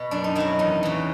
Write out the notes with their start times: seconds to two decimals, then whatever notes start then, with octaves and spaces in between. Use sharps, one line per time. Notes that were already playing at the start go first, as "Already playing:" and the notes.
Already playing: B2
0.11 F#2 D4
0.24 D#4
0.35 D#3 F#3 E4
0.59 E2 D#4
0.83 C#3 E3